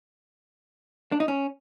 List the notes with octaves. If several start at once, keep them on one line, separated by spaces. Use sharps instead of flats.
D4
D#4
C#4